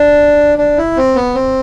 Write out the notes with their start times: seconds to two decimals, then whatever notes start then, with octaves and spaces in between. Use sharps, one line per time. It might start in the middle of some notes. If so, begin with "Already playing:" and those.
Already playing: D4
0.58 D4
0.78 E4
0.97 C4
1.15 B3
1.35 C4